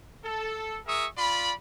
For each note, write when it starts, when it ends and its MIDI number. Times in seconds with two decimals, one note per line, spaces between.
0.25 0.78 69
0.87 1.06 68
0.87 1.06 70
0.87 1.06 76
0.87 1.06 85
0.87 1.06 87
1.18 1.52 65
1.18 1.52 74
1.18 1.52 83